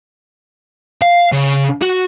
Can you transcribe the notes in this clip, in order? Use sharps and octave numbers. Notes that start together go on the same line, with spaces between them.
F5
C#3
F#4